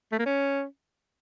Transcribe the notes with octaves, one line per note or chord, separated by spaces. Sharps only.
A3
A#3
C#4